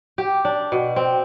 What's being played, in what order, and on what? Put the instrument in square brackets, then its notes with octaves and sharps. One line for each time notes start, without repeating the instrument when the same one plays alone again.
[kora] G4
D4
B2
C4